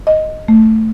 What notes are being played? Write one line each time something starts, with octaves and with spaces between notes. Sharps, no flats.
D#5
A3